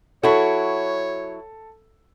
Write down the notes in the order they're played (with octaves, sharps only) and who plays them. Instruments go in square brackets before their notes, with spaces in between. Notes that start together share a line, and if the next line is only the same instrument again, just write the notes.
[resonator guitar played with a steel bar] F#3 E4 F#4 [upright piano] A4 [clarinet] C#5